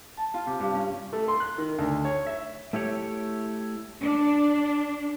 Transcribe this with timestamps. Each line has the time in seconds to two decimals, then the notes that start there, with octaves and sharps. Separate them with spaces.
0.17 A5
0.34 F4
0.46 C3
0.60 G2
0.74 C#4
1.13 A3
1.28 C6
1.40 F#6
1.58 D#3
1.79 D2
2.05 C#5
2.26 E5
2.73 A3 E4 G4 C#5
4.01 D4